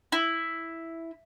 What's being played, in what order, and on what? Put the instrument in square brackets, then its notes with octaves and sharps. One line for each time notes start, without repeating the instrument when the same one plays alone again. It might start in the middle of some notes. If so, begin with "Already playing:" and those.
[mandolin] E4